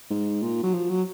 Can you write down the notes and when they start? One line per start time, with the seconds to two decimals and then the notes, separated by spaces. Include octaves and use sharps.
0.11 G#2
0.43 A#2
0.63 F#3
0.74 F3
0.90 F#3